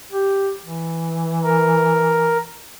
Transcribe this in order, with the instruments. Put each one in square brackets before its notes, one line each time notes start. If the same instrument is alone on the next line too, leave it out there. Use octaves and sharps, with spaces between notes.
[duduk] G4
E3
[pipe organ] A#4